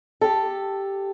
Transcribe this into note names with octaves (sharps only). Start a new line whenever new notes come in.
G4 A4